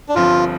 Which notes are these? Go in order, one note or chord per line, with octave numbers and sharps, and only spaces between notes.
D4
G1 G2 F3 C4 F4